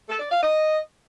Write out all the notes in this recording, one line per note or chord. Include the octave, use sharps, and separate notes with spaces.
A4
D5
F5
D#5